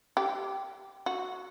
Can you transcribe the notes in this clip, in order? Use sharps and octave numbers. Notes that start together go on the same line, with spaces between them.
G4
F#4